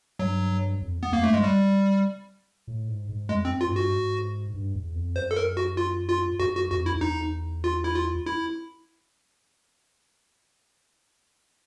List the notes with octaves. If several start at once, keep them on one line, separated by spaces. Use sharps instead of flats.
G2 F#3
F2
E2
B3
F2 A#3
G2 A3
G#3
G3
A2
G#2
G#2
F2 G#3
C4
F#2
F4
G#2
G2 F#4
G#2
G2
E2
F2
F#2 C5
A4
A#4
F#4
F4
F4
F#2 F#4
F#4
F2 F#4
E4
F2
E2 D#4
F4
E4
F4
E4